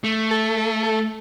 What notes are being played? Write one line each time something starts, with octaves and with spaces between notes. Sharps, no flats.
A3
A4
A4
A4